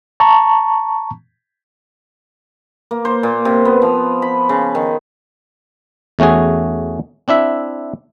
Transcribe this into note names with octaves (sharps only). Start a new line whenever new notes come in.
A5 A#5 C#6
A#3
C5
A#2
C3
B3
F3
B5
C#3
D#3
E2 A3 C#4 F#4 G#4
C4 D4 E4 E5